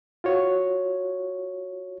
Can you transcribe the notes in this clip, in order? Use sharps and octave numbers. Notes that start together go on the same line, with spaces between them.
F4 F#4 C#5